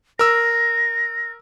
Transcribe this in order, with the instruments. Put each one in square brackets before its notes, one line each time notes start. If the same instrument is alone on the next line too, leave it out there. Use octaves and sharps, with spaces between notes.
[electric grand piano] A#4 E6 [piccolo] A#6